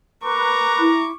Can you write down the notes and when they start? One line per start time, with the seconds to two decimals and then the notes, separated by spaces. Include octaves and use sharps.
0.24 A#4 B4 A#5 C#6 D6
0.80 E4